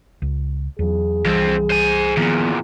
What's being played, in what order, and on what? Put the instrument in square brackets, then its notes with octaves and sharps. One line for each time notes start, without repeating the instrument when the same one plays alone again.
[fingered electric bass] C#2
[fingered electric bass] E2 F#3 [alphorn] G#4
[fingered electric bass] C2 E3 G3 [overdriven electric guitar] F2 C4
[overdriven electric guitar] C5 G#5
[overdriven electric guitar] E2 A#2 [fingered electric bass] D#3 F3 B3